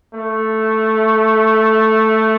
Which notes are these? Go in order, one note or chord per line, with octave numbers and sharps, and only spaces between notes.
A3